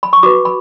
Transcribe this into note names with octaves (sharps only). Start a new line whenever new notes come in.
B5
C#6
F#4 B4 D6
B5